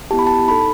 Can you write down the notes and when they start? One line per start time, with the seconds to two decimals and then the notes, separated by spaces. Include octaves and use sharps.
0.11 B3 E4 G4 A5
0.19 B5
0.27 A5
0.48 D#4 A4 B5